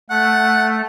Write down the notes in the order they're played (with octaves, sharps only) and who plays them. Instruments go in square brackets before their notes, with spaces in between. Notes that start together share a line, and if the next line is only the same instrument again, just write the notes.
[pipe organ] A3 [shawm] F#5